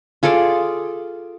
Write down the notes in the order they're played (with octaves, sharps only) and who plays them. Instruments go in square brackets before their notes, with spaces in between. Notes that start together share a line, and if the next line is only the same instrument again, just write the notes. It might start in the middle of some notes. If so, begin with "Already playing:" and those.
[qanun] F4 G#4 A4 D5